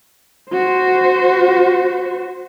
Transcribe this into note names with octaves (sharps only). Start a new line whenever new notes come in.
F#4 C5